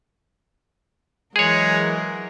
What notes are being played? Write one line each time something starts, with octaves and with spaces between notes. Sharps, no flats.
E3 F#3 G#3 G#4 A#4 C#5